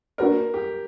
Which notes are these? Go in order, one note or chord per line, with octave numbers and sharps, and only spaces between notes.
A#3 D4 F#4 A#4 B4 D5
G4